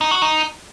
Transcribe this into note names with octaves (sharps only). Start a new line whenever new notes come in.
D#4
F#4
D#4